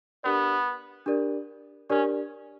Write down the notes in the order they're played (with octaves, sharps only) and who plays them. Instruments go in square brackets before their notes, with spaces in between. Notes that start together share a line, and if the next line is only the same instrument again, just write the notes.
[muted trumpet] B3 [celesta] D4 G4 A#4 D5
[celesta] D4 G4 A#4 D5
[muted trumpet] C#4 [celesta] D4 G4 A#4 D5